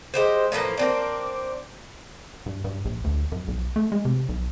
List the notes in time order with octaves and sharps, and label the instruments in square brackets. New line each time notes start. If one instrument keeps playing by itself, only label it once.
[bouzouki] G#3 G4 C5
A2 E3 F3 A#3
A#3 C4 D4
[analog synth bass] G2
G2
A#1
D2
F#2
B1
A3
G#3
C3
B1